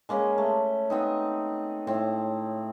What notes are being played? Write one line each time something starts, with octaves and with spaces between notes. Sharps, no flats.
G#3 A#3 C#4 B4
A3
B3 C4 D#4
A2 C4